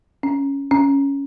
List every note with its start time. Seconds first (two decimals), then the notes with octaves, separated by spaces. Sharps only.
0.23 C#4
0.71 C#4